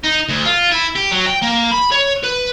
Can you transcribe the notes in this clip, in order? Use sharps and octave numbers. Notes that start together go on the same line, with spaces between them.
D#4
D2
F4
E4
G4
F#3
G5
A#3
B5
C#5
B4